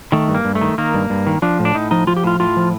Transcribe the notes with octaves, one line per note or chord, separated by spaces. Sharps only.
D#3 A3
G2
A#3
G2
A3
D#3
D#3 A#3
G2
G2
D#3
F3 D4
A2
D4
A2 D#4
F3 D#4
F3 F4
G4
A2 F4
A2 F4
F3